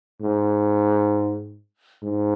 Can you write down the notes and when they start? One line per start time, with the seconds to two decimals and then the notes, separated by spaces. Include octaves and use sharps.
0.22 G#2
2.03 G#2